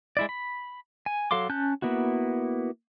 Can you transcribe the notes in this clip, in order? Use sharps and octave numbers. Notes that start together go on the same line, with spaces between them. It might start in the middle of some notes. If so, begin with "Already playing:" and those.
G#3 E4 D5
B5
G#5
F#3 A4 F5 C6 D6
C#4 A5 F#6 G6
A#3 B3 E4 F#4